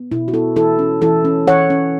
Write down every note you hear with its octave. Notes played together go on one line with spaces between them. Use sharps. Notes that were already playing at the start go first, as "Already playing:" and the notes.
Already playing: B3
B2 E4
F#4
B3 E4 A4
E3 E4 A4
C#4
E3 E4 A4
C#4
E3 C#5 F#5
C#4